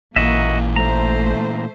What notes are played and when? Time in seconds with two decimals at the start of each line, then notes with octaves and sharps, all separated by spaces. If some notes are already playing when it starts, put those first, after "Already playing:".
0.16 A1 A#2 E3 A#3 F#4 D#5 E5
0.76 A3 C5 A#5